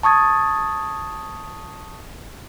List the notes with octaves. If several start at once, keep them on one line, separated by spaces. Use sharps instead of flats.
A5 C#6 D#6 G#6 A6